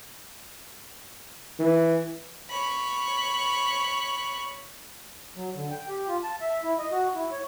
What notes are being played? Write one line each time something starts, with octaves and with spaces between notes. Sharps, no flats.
E3
C#5 B5
F#3
D3
G5
G4
F4
A5
E5
E4
D#5
F#4
E4
C#5